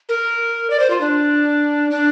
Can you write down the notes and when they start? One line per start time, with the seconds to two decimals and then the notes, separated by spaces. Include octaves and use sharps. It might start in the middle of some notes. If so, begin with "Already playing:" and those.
0.09 A#4
0.70 D5
0.80 C5
0.90 F4
1.01 D4
1.91 D4